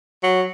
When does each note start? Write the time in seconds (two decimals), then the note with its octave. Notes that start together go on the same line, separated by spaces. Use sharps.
0.23 F#3